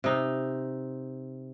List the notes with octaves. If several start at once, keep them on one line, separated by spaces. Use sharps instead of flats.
C3 D#4